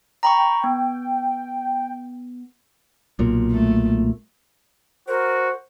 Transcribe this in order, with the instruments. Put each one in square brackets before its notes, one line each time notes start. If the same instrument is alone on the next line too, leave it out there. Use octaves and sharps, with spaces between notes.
[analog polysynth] G5 [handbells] A#5 B5 C#6
[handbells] B3
[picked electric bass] B1 A#2
[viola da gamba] A3
[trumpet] F#4 [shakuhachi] A#4 [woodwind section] C5